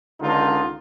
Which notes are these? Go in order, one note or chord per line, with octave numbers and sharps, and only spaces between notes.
C#2 D3 D#3 D#4 F4